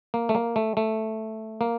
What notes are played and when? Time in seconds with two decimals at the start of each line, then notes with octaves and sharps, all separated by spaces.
0.14 A#3
0.29 A3
0.35 A#3
0.56 A3
0.77 A3
1.61 A#3